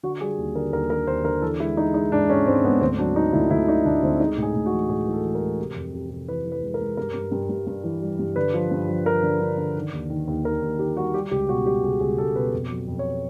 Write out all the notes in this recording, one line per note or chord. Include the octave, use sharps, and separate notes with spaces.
D3 F#4
G3 G#4
D#2
D3 A#4
D#2 A#4
D3 A#4
D#2 C5
D3 A#4
E3 A4
G#3 E4
G#3 D#4
G#3 D#4
G#2 D4
G#2 C#4
G#2 C4
G#2 B3
D2 C4
F#3 D4
F#3 D#4
D2 E4
D2 E4
D3 D#4
D2 D4
D2 C4
G#3 D#4
A2
G#4
A2
F#4
E3
A2 G#4
E3
A4
E3
A#4
G#3
C3
F2
C3
C3
E3 B4
E3
B4
G#3
A#4
G#3
G2 A#4
G2
G2
G2
G2
E3
G3
G2
D3 B4
F3
G2
F3
D3 A#4
D3
D3
D3
D#3
D#2
D#3
D#2
D#3 A#4
D#2
D#3 G4
G3 F#4
G3 G4
C#2 G4
B2 F#4
G3 G4
C#2 G#4
C#2 G#4
C#2 A4
B2 B4
F2
F#3
F2
C#5